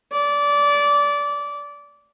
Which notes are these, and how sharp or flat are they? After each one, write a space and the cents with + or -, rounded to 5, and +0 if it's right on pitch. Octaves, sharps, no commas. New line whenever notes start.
D5 -20